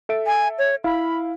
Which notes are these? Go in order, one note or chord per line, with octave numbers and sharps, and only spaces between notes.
A4 E5 D7
G#5
C#5
E4 F5 B5